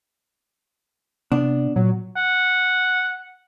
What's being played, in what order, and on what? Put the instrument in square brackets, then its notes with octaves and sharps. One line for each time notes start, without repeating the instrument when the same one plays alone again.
[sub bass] C3 [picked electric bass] B3 [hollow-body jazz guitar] D4
[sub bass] A#2 [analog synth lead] F#3
[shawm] F#5